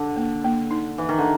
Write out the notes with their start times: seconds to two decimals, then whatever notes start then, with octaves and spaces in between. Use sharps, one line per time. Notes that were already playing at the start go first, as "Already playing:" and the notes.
Already playing: D3
0.16 A#3
0.44 A#3
0.71 D#4
0.97 E3 D#4
1.09 D#3
1.18 D3